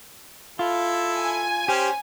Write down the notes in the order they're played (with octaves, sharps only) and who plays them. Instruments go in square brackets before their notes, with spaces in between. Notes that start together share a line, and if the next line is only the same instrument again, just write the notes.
[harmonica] E4 A4 [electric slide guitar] F4
[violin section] G#5
[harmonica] C#4 C5 [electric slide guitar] G4